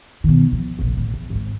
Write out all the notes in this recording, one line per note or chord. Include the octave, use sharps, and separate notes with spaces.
B2 D#3
F3
F1 A#1
A2 D3
E2
G#1 G#2